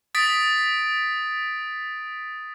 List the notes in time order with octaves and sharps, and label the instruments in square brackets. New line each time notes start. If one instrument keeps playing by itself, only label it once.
[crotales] D#6 A6 B6 D7